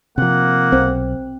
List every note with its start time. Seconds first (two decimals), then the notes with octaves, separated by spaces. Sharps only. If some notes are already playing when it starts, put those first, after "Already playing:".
0.18 C3 F3 A#3 F#5
0.72 B1 C4